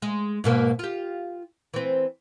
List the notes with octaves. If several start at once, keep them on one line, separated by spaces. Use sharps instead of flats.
G#3
G#2 B2 A#3
F4 G4
E3 C4